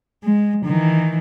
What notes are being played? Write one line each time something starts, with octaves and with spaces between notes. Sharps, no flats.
G#3
D#3 E3